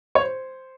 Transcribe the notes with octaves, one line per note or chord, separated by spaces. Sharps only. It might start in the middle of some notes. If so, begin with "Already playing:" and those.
C#5
C5